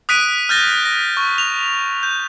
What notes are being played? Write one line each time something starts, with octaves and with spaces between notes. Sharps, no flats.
D#6 F#6 B6 D7 D#7
F6 G6 A6 A#6
A#6
C#6
F7
G6